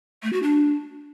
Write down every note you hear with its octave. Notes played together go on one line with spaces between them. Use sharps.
A3
F#4
D4